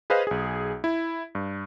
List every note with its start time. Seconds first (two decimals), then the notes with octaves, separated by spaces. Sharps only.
0.10 G#4 B4 C5 D#5 F5
0.27 B1 G#4
0.84 E4
1.35 G2